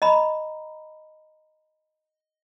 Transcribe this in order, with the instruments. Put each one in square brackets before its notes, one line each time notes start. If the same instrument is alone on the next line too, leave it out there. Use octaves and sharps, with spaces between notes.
[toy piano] D#5 A#5 B5